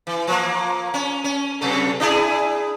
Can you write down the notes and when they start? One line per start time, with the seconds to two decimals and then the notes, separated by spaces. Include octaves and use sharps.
0.07 E3
0.27 F3 A#3
0.94 C#4
1.24 C#4
1.61 F#2 C3 A4
2.00 D4 E4 G#4